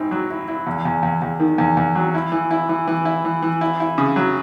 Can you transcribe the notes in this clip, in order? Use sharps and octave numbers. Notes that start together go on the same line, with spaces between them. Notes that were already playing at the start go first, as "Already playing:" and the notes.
Already playing: G#2 C4 E4
F#3
E4
E4
E2
E2
E2
E2
D#3
E2
E2
F#3
E4
E3
E4
E3
E3
E4
E3
E3
E4
E4
C#3
F#3